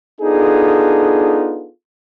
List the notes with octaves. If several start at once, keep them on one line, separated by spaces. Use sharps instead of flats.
B3 D4 D#4 F4 G#4 A4